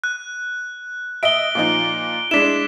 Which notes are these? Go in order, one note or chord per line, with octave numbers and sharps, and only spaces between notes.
F#6
D#5 E5 D7 G7
A#2 F3 D#4
G#3 D4 E4 B6 E7